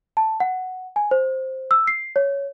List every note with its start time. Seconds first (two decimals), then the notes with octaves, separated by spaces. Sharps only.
0.17 A5
0.40 F#5
0.96 G#5
1.11 C5
1.71 E6
1.87 C7
2.16 C#5